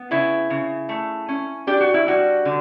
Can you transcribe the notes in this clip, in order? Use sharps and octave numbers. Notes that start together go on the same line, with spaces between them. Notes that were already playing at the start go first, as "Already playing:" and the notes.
Already playing: B3
C#3 E4
C#3
A3
C#4
D4 G4
F#4
E4
G3 F#4
D3